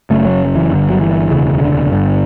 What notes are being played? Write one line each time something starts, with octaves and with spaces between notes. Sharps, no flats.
F#1 F#2 C#3 A3
F#3
E3
G1 G2 D3
F#3
E3
E1 D2 C#3
D3
G1 G2 D3